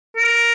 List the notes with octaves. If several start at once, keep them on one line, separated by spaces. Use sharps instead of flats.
A#4